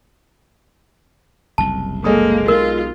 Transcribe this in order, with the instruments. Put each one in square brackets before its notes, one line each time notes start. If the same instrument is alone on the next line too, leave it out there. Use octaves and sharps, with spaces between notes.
[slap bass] F#1 C2 [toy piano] A5
[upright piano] G#3 A4 D#6 [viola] A#3
[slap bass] B1 [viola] F4 [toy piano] A#4